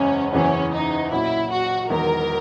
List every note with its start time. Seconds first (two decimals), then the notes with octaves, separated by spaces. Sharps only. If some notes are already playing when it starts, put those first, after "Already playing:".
Already playing: F#1 E2 C#3 G#3 C#4
0.32 F#1 E2 C#3 E3 C#4
0.72 D#4
1.11 B1 A#2 F#3 C#4 E4
1.51 F#4
1.90 E1 E2 D#3 F#3 A#4